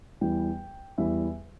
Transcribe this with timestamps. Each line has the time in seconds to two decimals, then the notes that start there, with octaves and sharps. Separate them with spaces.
0.21 E2 E3 G3 G5
0.98 E2 E3 G3 E5